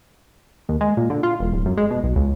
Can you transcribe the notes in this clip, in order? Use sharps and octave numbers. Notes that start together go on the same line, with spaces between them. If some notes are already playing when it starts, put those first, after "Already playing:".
D#2
G#3
A#2
D3
F4
E1
D1
F#2
G#3
B2
B1
C#2